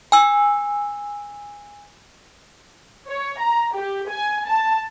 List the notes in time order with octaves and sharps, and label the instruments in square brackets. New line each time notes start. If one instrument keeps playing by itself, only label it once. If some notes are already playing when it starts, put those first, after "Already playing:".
[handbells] G#5 E6
[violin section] C#5
A#5
G4
G#5
A5